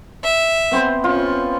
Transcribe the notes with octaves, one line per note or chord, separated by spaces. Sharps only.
E5
B3 C4 C5
C#4 F4